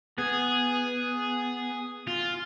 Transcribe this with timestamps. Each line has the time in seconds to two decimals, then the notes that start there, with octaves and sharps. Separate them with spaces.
0.18 B3 G#4
2.07 F4